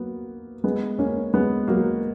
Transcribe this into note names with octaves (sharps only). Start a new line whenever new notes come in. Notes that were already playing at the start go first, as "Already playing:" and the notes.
Already playing: F#3 A#3 B3
G#3 B3
A#3 C#4
G#3 B3
F#3 A#3